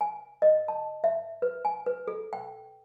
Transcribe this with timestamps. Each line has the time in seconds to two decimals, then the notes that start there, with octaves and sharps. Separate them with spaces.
0.01 G#5
0.42 D#5
0.68 A5
1.04 E5
1.42 B4
1.65 G#5
1.86 B4
2.08 A4
2.33 G5